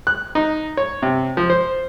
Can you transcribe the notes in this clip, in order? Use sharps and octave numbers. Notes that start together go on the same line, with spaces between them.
F#6
D#4
C#5
C3
F3
C5